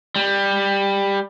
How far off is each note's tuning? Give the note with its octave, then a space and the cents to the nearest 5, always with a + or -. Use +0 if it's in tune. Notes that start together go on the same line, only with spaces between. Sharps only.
G3 +15